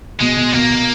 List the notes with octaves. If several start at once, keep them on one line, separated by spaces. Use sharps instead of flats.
B2 G#3
B2
B2 A#3
B2